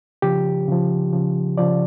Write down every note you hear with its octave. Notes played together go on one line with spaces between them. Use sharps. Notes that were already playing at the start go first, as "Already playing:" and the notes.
C#3 F3 G4
C#3 F3
C#3 F3
C#3 F3 D5